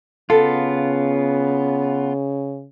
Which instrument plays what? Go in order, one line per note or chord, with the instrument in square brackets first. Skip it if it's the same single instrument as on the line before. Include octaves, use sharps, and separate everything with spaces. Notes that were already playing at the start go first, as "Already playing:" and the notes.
[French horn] C#3 [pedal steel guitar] B3 F4 [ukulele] A4